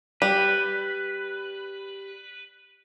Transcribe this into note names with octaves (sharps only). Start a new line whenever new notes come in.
G3 B4